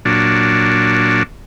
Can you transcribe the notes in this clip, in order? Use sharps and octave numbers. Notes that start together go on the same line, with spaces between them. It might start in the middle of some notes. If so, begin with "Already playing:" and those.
A#2 F#3 D4